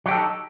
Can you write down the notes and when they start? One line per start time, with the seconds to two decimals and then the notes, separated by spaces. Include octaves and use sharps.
0.06 F#3
0.08 G4
0.11 A4
0.14 D#4